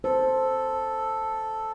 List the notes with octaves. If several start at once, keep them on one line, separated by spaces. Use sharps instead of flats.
A4 C5